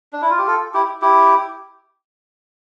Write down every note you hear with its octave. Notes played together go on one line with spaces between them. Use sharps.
D4
E4
F4
G4
F4 A4
E4 G4
E4 G4